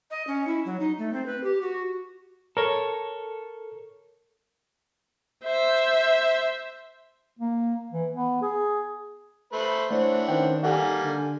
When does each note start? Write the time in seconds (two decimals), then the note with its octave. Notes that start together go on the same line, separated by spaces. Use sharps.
0.11 D#5
0.27 C#4
0.48 E4
0.65 F#3
0.80 D#4
0.99 A3
1.13 C4
1.26 B4
1.44 G4
1.62 F#4
2.57 A4 A#4 C#5
5.45 C5 E5
7.39 A#3
7.92 E3
8.12 B3
8.42 G#4
9.53 A3 B4 C5
9.91 E3 A3 D4 C5 C#5 F#5
10.28 D#3 C#4 C5 G5
10.63 G3 A#3 A4 D5 F#5 G#5
11.03 D3